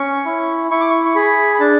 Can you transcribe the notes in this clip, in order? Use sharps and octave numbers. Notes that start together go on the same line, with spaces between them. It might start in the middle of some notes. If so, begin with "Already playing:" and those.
Already playing: C#4 C#6
E4
E4 C#6
D6
C#6
C#6
G#4 B5
B5
D4 A5